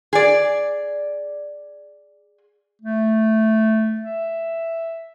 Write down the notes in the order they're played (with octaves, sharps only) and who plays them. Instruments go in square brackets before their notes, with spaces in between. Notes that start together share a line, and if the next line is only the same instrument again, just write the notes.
[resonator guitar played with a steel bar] G#4 D5
[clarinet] A3
E5